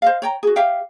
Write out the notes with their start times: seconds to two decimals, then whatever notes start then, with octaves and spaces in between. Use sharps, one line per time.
0.02 C5 D#5 F5
0.22 C#5 G5 A#5
0.43 F#4 G#4
0.56 G4 E5 F5 G5